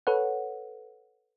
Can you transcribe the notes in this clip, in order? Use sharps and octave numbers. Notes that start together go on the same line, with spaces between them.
A4 B4 C#5 F#5